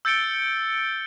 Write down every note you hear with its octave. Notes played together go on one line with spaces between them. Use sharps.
E6 G6 A6 C#7 D7 G7